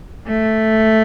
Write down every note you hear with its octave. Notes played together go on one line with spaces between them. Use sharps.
A3